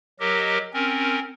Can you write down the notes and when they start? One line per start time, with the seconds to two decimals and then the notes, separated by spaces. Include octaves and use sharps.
0.20 F#3 G4 A#4 D#5
0.73 C4 C#4 A#4